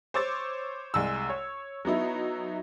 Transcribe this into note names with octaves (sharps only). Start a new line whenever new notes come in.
C5 C#5 D6 E6 A6
C2 G#3 E6
C#5
F#3 B3 D#4 E4